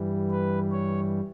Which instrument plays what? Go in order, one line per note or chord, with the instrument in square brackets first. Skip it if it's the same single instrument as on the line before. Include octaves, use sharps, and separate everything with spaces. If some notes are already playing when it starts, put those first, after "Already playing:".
Already playing: [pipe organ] G2 E3 G3
B4
C#5